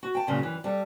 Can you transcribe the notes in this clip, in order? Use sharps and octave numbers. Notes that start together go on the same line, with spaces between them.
F#4
G5 A5
A#2 C#3 F#3
F#2 E3
G3 A4